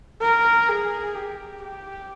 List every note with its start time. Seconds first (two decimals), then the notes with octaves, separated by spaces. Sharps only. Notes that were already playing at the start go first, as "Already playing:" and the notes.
0.22 A#4
0.69 G#4
1.15 G4
1.62 G4